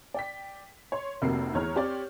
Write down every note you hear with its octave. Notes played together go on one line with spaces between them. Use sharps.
D5 G5 B6
C#5 C6
F1 C3 A#3 C4 F#4 C7
E2 G#4 C#5 A#5 F6
C4 G4 C#5 D5